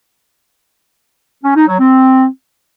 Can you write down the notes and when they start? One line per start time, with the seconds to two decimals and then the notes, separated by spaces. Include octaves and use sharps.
1.44 C#4
1.56 D#4
1.68 F#3
1.79 C4